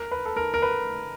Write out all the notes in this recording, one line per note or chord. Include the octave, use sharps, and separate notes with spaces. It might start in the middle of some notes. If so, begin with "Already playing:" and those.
Already playing: A#4
B4
A4
A#4
A#4
B4